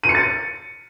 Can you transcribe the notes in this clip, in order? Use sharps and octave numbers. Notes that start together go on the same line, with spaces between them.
D#7
C#7
A6